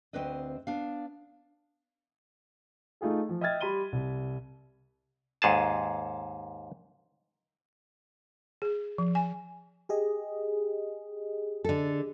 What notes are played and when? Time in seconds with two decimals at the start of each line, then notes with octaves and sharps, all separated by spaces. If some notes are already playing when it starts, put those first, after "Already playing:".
0.13 D2 C4 D4 B4 D#5
0.67 B3 D4 F5
3.01 A3 D#4 F4 G#4 A4
3.29 F3
3.41 D#5 E5 G5 F6 G#6 A6
3.61 G3 G4 B5 C6 D#7 G7
3.92 C2
5.42 D#2 G#2 G#4 A5
8.62 G#4
8.98 F3
9.15 G#5
9.89 G4 G#4 D#5
11.64 D3 A4